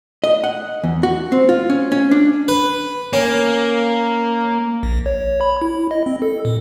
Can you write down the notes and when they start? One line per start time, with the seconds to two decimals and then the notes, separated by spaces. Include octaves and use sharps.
0.24 D#5
0.44 F#5
0.84 E2
1.03 F#4
1.32 C4
1.49 F4
1.70 C#4
1.92 C#4
2.11 D4
2.48 B4
3.13 A#3 C#4
4.83 A#1
5.06 C#5
5.41 B5
5.62 E4
5.91 D#5
6.06 C4
6.22 A4
6.45 A#2